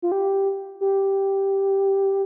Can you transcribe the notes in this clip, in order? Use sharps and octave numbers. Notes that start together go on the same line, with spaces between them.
F4
G4
G4